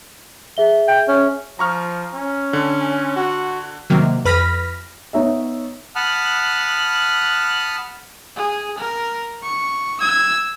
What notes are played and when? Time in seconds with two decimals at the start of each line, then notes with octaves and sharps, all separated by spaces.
0.57 G#4 E5 G7
0.88 G5
1.08 C#4
1.59 F3 A#5 C#6 F6
2.14 C#4
2.53 D3
3.16 F#4
3.90 C3 D#3 F#3 A#3
4.25 F2 B4 B5 F6 A#6 B6
5.13 B3 D#4 C#5 E5
5.96 F#5 A5 B5 D#6 F6 F#6
8.37 G#4
8.79 A#4
9.43 C#6
10.00 E6 G#6